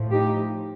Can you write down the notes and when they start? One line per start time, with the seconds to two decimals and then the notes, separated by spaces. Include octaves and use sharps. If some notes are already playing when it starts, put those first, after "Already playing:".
Already playing: A2 F3
0.12 D#4 G4